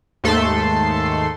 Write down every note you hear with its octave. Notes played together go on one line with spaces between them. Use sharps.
D#2 G#2 A3 A4 C6